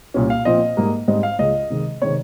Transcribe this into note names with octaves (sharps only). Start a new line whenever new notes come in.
C2 A#2 G3 C#4
F5
A#2 F3 C4 D#5
G#2 G3 A#3
G#2 G3 C4 D#5
F5
C#2 C#3 G#3 C#4 D#5
C3 D#3 G#3
C3 D#3 G#3 C4 C#5